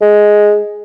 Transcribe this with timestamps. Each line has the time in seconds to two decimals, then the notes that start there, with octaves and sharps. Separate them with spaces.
0.02 G#3